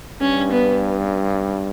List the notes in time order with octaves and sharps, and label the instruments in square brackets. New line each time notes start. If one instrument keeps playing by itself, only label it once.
[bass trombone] G2 [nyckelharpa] C#4
[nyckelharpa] B3